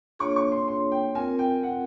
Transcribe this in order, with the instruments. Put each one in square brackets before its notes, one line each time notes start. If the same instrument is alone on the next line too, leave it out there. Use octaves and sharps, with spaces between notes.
[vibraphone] A#3 D4 F4 G#4 C#5 [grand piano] C#6
[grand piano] C#6
C6
C6
G5
[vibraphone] C4 F4 A#4 [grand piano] G#5
[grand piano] G5
F#5